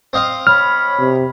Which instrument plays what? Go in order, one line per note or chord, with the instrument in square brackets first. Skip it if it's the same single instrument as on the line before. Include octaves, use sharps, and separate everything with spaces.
[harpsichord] C4 D#5 F5
[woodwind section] C#5 B5 [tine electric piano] F6
[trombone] C3